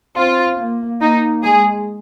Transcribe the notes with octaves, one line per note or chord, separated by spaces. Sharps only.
C4 F4
A#3
A#3 D#4
G#3 G#4